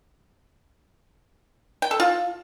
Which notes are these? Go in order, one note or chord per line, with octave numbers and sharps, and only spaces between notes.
G5
A4
F4